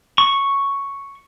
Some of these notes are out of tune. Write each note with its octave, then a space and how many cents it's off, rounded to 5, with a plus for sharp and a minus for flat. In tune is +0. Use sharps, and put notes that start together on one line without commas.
C#6 +0